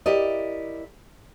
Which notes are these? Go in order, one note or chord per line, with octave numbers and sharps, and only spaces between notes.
E4 G4 A#4 D5 D#5